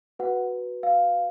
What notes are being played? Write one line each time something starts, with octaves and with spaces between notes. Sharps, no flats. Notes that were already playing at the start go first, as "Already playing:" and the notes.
F#4 B4 F#5
F5